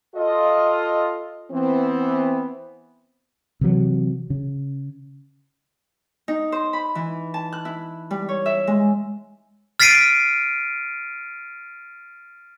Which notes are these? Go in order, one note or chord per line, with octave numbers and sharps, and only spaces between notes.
F4 A4 D#5
E3 B3 C4
C3 E3 F#3
C#3
D#4
C5
B5
E3
A5
F#6
E4
G3
C#5
E5
G#3
F6 A6 B6 C7 D7 D#7